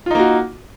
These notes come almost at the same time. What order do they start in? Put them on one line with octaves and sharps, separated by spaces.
F4 D#4 A#3 F#4